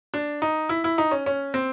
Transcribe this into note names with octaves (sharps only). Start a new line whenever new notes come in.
D4
D#4
E4
E4
D#4
C#4
C#4
C4